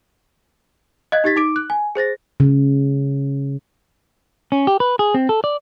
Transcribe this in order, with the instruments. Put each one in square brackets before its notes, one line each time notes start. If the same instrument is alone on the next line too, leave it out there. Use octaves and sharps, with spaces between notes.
[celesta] D#5 F5 F#6 G#6
D#4 G4 G#6 A6 B6
D#4 D6 D7
F#6
G#5
G#4 C5 A6 A#6
[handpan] C#3
[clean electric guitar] C#4
G4
B4
G#4
C4
A4
D5